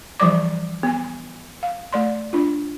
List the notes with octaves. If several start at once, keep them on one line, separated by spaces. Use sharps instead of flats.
E3 F3 G3 D5 D6
B3 G#5
F5
A3 D5 C6
D4 F4